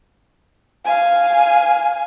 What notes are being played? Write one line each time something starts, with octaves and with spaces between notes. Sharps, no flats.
F5 G#5